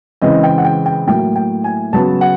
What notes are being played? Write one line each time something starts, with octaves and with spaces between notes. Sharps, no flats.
C#3 E3 G#3 C4 D#5
G5
F#5
G5
G5
A2 F#3 A#3 G5
G5
G#5
C#3 F#3 B3 A5
F#5